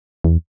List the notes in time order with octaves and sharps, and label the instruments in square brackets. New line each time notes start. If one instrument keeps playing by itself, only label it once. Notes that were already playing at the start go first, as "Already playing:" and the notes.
[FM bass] E2